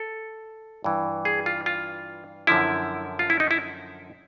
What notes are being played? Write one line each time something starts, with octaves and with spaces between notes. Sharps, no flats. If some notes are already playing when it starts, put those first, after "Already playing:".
Already playing: A4
G2 E3
G#4
F4
F4
F#2 D3 F3 E4
F4
E4
D#4
E4